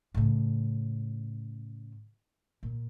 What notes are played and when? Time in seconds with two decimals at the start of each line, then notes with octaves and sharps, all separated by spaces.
0.14 A2 C#3
2.63 A#2